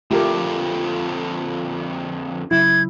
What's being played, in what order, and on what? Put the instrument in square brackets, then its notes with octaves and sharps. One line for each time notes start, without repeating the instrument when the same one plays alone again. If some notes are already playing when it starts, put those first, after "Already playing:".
[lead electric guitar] F2 D3 [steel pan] A3 G4 A#4 [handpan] F4
[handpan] C#3 F#3 [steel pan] E4 [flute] G#6